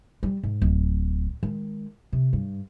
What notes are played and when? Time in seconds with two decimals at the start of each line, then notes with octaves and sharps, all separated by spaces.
0.23 G3
0.43 G#2
0.62 D1
1.43 D#3 G#3
2.12 C3
2.33 G2